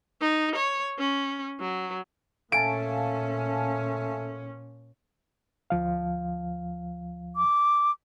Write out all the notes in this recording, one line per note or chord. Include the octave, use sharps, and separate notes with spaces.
D#4
C#5
C#4
F#3
A#2 A3 C#4 F5 G#5 A5 D7
D2 F3 F5
D6